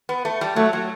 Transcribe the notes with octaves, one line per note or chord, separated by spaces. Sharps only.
B3
A3
G3
F#3 A3
F#3